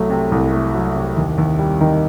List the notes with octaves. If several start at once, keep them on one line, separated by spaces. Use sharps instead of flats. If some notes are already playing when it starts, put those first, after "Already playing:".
Already playing: C2 F#3 A3
C3
C2
A3
F#3
C3
D#2
D#2
G3
D#3